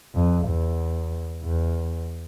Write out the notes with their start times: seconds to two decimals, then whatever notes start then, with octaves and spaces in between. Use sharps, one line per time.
0.15 F2
0.47 E2
1.44 E2